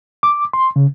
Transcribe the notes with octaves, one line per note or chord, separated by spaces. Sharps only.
D6
C6
C#3